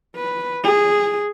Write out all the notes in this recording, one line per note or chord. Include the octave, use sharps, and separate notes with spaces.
B4
G#4